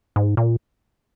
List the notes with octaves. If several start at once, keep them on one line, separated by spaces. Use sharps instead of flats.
G#2
A#2